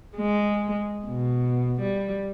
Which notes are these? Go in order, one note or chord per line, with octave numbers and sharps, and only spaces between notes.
G#3
B2
G3